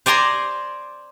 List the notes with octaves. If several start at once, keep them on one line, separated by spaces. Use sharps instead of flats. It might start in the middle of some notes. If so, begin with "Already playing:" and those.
C5 D5 G#5 A#5 C6